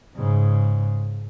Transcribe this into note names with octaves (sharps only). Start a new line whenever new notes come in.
G#2 C#3